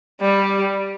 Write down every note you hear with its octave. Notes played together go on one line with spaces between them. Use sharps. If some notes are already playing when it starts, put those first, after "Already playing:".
G3